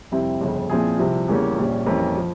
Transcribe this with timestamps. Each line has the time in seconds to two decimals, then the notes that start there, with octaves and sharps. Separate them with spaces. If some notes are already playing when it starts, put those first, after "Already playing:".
0.12 F2 C3 G3 C4 E4
0.41 G1 F2 C#3
0.70 A#2 F3 C4 E4 G#4
0.99 C2 C3 F3
1.28 E2 C#3 G3 A#3 C#4
1.57 A#1 A#2 G3 C#4
1.86 F2 E3 G3 A#3 C#4
2.17 F3